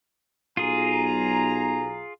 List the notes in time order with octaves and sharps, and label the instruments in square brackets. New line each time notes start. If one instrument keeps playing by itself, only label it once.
[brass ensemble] B1 G#5 A#5 [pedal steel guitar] F4 G#4